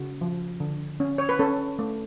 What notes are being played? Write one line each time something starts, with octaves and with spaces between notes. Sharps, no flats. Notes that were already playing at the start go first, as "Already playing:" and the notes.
Already playing: C#3 F#4
F3
D3
C#4
C#5
B4
C#4 A4
A3